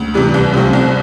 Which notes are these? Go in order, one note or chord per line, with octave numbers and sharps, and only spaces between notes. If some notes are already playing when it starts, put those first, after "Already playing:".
Already playing: D2
C3 E3 G3
C2
C3 F3 A3 C4
C2